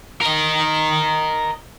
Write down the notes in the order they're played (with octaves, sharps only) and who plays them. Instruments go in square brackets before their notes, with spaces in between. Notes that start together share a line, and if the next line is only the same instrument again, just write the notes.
[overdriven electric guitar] A#4 D#5